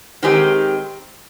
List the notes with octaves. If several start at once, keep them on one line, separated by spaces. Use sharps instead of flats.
D#3 G#3 C4 D#4 G4